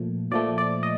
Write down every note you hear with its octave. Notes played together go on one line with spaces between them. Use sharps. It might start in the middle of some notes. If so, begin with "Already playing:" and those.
Already playing: A#2 F3 A3
A#2 F3 A3 D5
D5
D#5